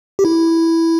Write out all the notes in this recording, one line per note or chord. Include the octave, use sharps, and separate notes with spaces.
G4
E4